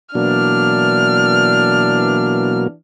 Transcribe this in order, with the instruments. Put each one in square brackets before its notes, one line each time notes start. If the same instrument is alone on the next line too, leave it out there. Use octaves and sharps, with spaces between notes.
[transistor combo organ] B2 F#3 A#3 [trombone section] E3 D4 [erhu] F6